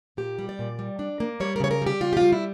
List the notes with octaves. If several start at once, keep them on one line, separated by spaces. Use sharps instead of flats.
A#2 G4
G3
D5
A#2
G3
D4
A#3
G3 C#5
A#4
C#3 C#5
A#4
G3 G4
C#3 F4
G4
G3 F4
E4